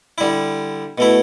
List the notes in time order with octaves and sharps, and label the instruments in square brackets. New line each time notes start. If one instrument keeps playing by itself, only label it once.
[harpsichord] D3 G3 E4
B2 A3 E4